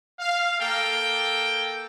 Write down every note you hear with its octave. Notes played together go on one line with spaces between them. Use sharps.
F5
A#3 A4 A#4 G5